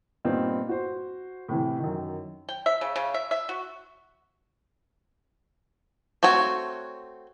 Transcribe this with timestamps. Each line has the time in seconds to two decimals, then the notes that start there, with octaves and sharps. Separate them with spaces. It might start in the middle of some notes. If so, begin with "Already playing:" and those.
0.25 G2 A#2 B3 C4 D#4
0.69 F#4 C5
1.48 A2 C3 E3
1.79 F#2 D#3
2.49 G5
2.66 E5
2.81 C#3
2.96 C#3
3.14 E5
3.31 E5
3.49 F#4
6.23 A3 C4 F#4 C#5